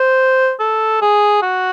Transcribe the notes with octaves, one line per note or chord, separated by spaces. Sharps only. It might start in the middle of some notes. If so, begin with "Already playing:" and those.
Already playing: C5
A4
G#4
F#4